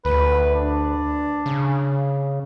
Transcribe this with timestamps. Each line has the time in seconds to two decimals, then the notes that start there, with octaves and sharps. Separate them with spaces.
0.05 D2 B4
0.52 D4
1.46 C#3